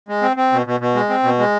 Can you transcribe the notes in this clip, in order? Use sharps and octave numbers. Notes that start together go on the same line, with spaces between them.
G#3
C4
C4
B2
B2
B2
G#3
C4
B2
G#3